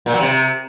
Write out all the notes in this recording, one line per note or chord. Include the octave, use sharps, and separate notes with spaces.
A#2
F#3
C3